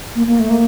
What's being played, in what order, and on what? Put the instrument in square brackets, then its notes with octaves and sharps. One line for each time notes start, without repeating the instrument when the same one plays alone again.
[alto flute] A#3
A#3
A3
A#3